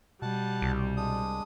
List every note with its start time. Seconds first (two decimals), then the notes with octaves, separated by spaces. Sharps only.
0.22 B2 G3 F#5 A5
0.62 C2
0.97 G#3 D4 D#6